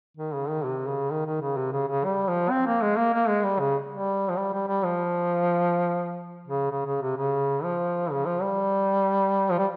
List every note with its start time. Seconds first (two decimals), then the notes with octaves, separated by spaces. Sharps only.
0.17 D#3
0.34 C#3
0.49 D#3
0.64 C3
0.87 C#3
1.11 D#3
1.26 D#3
1.41 C#3
1.57 C3
1.72 C#3
1.88 C#3
2.05 G3
2.28 F3
2.51 C4
2.66 A#3
2.82 G#3
2.97 A#3
3.13 A#3
3.29 G#3
3.44 G3
3.60 C#3
3.91 G3
4.30 F3
4.37 G3
4.53 G3
4.68 G3
4.85 F3
6.47 C#3
6.71 C#3
6.86 C#3
7.02 C3
7.17 C#3
7.64 F3
8.11 C#3
8.26 F3
8.42 G3
9.51 F3
9.58 G3